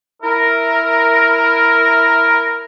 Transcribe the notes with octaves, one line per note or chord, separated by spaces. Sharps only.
E4 A#4